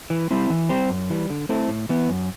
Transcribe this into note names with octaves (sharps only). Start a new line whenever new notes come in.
E3
G3 C4 E4
E3
G3 C4 G4
F#2
E3 G3
D3
A3 C4 E4 A4
A2
E3 B3
F#2